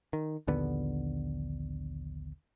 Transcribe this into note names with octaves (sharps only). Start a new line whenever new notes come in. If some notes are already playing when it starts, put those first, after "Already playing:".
D#3
A#1 D#2 D3 B3